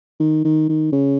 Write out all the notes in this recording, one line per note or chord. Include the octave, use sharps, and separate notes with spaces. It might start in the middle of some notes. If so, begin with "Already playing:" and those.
D#3
D#3
D#3
C#3